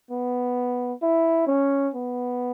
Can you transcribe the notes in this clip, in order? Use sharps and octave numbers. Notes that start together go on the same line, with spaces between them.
B3
E4
C#4
B3